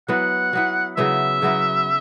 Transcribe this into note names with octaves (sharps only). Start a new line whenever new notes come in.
F#3 B3 E4 F#5
F#3 B3 E4
C#3 F#3 B3 E4 E5
C#3 F#3 B3 E4